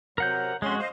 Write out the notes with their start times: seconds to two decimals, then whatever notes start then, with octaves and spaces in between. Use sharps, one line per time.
0.18 C3 F#3 A#4 F#5 G6
0.62 F2 G#3 C#4 F#4 C6
0.79 C5 D#5 F5